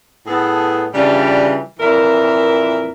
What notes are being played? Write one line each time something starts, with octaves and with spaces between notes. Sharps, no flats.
A2 B3 G#4 A4
C#3 E3 G3 D4 F4
F2 A#2 E3 A#4 E5